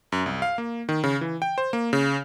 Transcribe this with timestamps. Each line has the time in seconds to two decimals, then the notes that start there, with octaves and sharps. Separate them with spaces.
0.12 F#2
0.26 C2
0.42 F5
0.58 A#3
0.89 D#3
1.04 C#3
1.21 E3
1.42 G5
1.58 C5
1.73 A#3
1.93 C#3